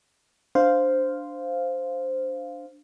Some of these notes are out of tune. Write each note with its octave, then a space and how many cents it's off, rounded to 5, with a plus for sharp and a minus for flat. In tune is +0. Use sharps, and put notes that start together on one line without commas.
D4 +0 C5 -5 F5 +0